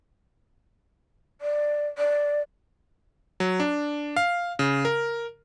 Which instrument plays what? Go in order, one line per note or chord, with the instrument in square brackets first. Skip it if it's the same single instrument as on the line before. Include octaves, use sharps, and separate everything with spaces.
[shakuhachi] D5
D5
[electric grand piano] F#3
D4
F5
C#3
A#4